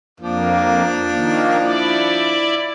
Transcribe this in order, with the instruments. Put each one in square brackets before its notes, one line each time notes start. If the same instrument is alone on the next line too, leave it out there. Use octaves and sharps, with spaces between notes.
[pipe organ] F2 A#3 [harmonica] F3 D4
[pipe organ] D#3 A#3
E4 D5